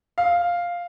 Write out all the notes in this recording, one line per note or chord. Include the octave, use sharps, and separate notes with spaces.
F5